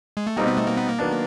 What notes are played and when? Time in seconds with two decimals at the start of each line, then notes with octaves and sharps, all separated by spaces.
0.17 G#3
0.27 A3
0.36 B2 G3 A#3 C4 D#4 G4
0.47 B3
0.57 A3
0.67 A#3
0.77 B3
0.88 A#3
0.99 D#3 F#3 B3 D4